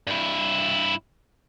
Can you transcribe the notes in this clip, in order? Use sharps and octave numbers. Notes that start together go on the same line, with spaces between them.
G2 E4